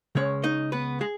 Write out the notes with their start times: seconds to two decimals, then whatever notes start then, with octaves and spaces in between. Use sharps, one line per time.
0.15 C#2 C#3 G#3 C#4 C#5
0.44 D#4 D#5
0.72 B3 B4
1.01 G#3 G#4